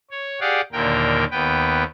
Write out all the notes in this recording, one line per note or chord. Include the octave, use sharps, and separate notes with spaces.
C#5
G4 G#4 D5 F5 F#5
D#2 A#2 D3 A#4 G5
D#2 B3 B4 G5